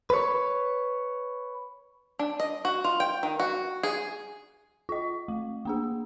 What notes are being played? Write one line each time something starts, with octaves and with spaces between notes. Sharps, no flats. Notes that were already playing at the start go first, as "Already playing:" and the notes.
B4 C#5
D4
D#5
F#4
F4
G5
D#3
F#4
G#4
F4 D#5
A3
A#3 D4 G#4